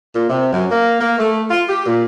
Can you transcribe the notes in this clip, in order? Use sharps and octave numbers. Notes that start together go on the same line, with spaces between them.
A#2
C3
F#2
A#3
A#3
A3
F4
G4
A#2